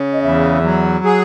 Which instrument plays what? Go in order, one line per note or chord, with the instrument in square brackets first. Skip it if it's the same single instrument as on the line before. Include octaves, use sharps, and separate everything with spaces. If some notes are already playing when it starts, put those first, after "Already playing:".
Already playing: [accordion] C#3
[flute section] D#5
[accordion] E2 [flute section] E5
[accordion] F#3
[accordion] G#4 [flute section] F#5